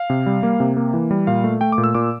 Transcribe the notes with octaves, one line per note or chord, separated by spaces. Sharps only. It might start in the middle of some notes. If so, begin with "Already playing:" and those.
Already playing: F5
C3
G3
A#3
C3
A#3
E3
G3
A#2 F5
A3
A3 G5
D6
A#2
E6
A#2 D6